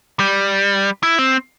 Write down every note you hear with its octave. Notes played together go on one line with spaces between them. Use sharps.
G3
E4
C4